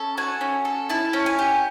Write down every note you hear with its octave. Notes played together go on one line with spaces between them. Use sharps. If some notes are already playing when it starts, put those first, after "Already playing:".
Already playing: C#4 A4
F#4 G#5
C#4
A4
E4 A5
C#4
G#5
G4